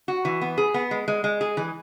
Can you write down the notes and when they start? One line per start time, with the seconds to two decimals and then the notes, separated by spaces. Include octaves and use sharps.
0.08 F#4
0.25 E3
0.41 B3
0.58 G#4
0.74 B3
0.91 G#3
1.08 G#3
1.24 G#3
1.41 G#4
1.57 E3